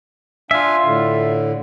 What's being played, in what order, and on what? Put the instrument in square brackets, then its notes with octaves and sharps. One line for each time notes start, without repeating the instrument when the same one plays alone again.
[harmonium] D4 F5 G#5 [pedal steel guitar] F4 E5
[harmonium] A2 D3